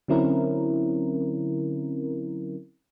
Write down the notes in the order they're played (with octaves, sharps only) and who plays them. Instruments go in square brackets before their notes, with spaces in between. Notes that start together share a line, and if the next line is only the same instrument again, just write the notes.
[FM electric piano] D3 F#3 C4 C#4 E4 A#4